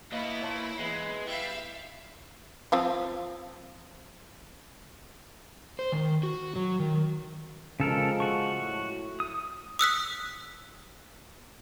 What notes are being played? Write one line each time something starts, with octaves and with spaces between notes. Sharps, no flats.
B2 A#3 B3 E4 D#5
A#2 C#5 A5 C6
E3 G#3 B3 B4
G3 E4 E5 F5
F3 C4 F4
C5
D#3
F#4
F#3
D#3
C#3 F3 G#3 A4 A#4
F#4 C#6
A2 A3
D#6
D#6 E6 F#6 B6